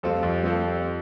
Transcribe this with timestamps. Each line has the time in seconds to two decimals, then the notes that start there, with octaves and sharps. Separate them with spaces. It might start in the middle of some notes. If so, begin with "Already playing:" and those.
0.03 F2 G3 C4 F4 A4 C5
0.23 F2
0.43 G3 C4 F4 A4 C5